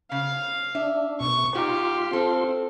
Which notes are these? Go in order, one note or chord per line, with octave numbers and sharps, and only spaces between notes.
C#3 F5
D4 E5
B2 C#6
G#2 D#4 F4 G4 C6
C4 A4